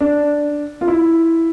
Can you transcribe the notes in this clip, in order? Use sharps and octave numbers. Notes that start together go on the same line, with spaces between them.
D4
F4
E4